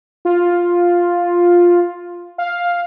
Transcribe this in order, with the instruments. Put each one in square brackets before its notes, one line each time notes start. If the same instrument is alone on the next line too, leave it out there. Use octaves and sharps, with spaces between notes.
[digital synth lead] F4
F5